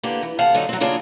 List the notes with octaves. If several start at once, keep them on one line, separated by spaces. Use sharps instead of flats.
D3 A#3 B3 G4
E3
D2 C3 F5 F#5 A5
D3 F#3 D#4
F#3 C4
C#3 A#3 D4 F4 G#4